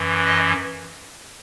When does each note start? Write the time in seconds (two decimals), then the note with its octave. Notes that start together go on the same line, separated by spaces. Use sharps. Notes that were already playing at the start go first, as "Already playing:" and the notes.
Already playing: F#2 E3
0.26 D#5